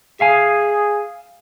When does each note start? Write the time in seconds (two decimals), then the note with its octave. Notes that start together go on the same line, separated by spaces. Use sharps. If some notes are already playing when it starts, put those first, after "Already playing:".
0.20 G#4 E5 F5 G#5